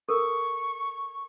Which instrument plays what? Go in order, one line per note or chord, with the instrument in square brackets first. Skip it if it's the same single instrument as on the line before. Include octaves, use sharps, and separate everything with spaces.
[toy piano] A4 A#4 [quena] C#6